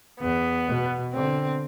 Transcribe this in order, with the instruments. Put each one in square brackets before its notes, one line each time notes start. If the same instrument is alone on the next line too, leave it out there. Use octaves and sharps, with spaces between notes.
[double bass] E2 [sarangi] B3
[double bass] B2
[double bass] D3 [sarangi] C4